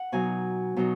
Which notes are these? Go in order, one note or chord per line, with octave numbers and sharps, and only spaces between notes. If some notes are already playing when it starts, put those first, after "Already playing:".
Already playing: F#5
B2 F#3 D#4 G#5
B2 F#3 D#4